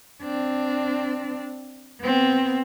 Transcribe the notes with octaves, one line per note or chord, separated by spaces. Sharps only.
C4 D4
B3 C4